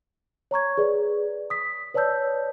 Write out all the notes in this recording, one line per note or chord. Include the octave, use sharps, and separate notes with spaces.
C#5 A#5 C#6 G#6
G#4 B4 D5
D#6 B6
B4 C#5 D5 A5 E6 G6